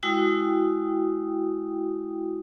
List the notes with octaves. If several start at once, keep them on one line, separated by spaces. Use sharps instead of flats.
G#3 E4 F#4 G5 D#6